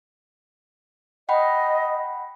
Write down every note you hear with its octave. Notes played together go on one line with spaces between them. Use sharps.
D#5 F#5 G5 B5